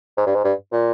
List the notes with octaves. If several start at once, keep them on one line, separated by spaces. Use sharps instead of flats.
G#2
G2
G#2
G2
A#2